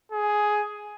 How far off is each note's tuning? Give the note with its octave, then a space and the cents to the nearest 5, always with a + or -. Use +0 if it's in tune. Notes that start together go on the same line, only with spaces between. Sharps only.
G#4 +10